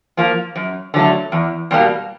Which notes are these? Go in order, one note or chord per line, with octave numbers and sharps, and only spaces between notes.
F3 A#3
F#2
D3 F#3 A3
E2
B2 G3 A#3